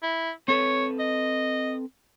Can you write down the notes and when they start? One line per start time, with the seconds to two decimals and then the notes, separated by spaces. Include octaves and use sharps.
0.03 E4
0.48 C4 A4 B4 C#5
0.99 D#5